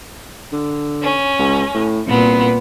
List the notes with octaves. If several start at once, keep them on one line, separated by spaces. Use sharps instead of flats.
D3
C#4
C#2
A2
C2 A#2 B3